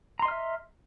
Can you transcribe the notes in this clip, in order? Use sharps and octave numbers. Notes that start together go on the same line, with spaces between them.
D#5 E5 A#5 C6 F6